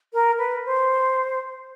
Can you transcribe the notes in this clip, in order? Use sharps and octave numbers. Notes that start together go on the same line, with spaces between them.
A#4
B4
C5